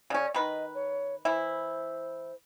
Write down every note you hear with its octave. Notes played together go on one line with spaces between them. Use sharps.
C#3 C#4 D5
D#3 B4 D#5
C#5
E3 E4 C5